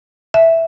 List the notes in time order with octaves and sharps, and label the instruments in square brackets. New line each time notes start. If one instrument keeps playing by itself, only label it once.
[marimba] E5